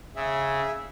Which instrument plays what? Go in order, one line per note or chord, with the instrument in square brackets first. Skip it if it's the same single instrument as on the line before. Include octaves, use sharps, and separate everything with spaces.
[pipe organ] C#3 [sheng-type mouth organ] G#4 E5